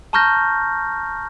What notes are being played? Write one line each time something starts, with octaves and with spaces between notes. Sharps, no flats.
A5 A#5 C#6 F6 G6 A#6